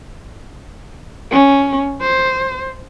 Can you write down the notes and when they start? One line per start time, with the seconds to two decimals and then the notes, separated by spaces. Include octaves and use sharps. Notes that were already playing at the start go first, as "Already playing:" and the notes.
1.31 C#4
2.01 C5